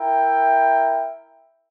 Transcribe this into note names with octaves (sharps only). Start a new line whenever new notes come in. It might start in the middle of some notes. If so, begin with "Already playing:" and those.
Already playing: E4 A#4 E5 G5